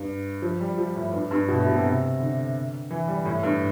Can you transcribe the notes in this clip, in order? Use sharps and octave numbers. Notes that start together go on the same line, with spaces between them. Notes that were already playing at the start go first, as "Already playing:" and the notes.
Already playing: G2
F3
G3
F3
A2
G2
G2
B2
A2
B2
C3
D3
E3
G3
A2
G2